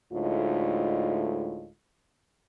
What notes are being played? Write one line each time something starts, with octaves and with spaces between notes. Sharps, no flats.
D2 A2 G#3 D#4 F4